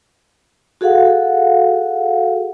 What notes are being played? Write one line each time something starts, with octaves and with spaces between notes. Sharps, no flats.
F#4 G#4 A4 F5 F#5